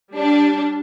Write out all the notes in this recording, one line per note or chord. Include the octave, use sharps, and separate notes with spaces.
G3 D4